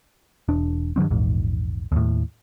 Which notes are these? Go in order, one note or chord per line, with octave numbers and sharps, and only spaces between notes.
E1 D4
G2 D#3 F#3 C4
A#1 E2 G#2
D#2 A2